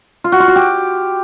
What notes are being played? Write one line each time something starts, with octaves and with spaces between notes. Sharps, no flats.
F4
F#4
F4
F#4
G4